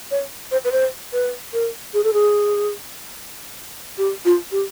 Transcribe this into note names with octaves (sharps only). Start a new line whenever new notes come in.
C#5
C5
B4
C5
B4
A#4
G#4
A4
G#4
G4
F4
G4